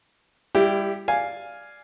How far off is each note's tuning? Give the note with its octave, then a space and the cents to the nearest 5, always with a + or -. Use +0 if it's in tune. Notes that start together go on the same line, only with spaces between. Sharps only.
G3 +30 E4 +20 G4 +0
D5 +0 F5 +0 G#5 +0